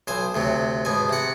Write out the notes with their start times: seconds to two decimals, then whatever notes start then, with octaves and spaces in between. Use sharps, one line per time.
0.07 B1 C5 G#5
0.35 D2 C3 F#3
0.85 G#2 B2 G#5
1.09 C3 F#5